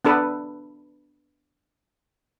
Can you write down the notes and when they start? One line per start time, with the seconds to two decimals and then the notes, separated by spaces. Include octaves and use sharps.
0.05 B3 D4 A4 B4